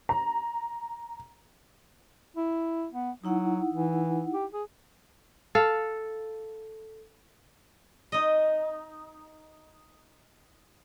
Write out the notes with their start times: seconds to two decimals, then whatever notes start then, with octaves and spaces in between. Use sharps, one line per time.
0.09 A#5
2.37 E4
2.92 B3
3.24 F#3 D#4 E4 F#5
3.73 E3
4.33 G4
4.54 G#4
5.55 A4 F5
8.12 D#4 D#5